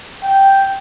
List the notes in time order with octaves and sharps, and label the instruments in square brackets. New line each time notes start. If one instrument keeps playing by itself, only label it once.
[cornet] G5